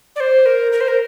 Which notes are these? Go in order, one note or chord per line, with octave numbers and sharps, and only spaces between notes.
D5
C5
A#4
A#4
C5
A#4